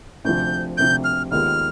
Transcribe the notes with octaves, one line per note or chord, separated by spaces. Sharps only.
D2 C3 F3 G6
D2 C3 F3 G6
F6
D#2 D#3 G#3 B3 F4 F6